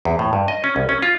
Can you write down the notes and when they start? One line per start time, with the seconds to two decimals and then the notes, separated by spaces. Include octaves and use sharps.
0.05 E2
0.19 A2
0.33 G2
0.48 D#5
0.64 C#4
0.76 C2
0.89 C#4
1.02 F4